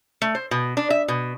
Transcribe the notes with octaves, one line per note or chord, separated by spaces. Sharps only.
A3
C5
B2
D4
E5
B2